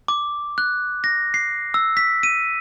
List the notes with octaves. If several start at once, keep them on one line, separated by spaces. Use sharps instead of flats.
D6
F#6
A#6
C7
E6
B6
D#7